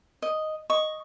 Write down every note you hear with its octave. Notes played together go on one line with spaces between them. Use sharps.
D#5
D#5 C#6